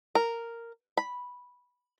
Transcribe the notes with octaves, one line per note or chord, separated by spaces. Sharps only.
A#4
B5